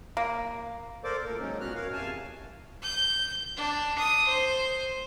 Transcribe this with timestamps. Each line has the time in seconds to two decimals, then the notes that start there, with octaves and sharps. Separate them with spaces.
0.17 A#3
1.04 A4 A#4 C5 D5 D6
1.24 D2 A#2 A#3 A4 A#4
1.40 F#3 G#3 A#3 C#4 D#4
1.60 A#2 B3 C#4 F#4 F6 F#6
1.75 A#4 C#5 F5
1.93 E2 C3 F5 G#5 A5
2.83 G6
3.57 D4
3.99 D#6
4.28 C5